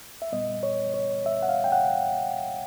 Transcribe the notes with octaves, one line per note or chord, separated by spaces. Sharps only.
E5
A#2 G3 B3 D#5
C#5
C#5
E5
F#5
F5
G5
F#5